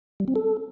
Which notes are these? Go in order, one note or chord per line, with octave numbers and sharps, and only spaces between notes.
G3
C4
A4